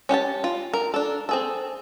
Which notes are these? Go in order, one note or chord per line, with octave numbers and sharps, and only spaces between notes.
C#4 G4 F5 A5
F4
A#4
D4 A4
C4 G#4 A4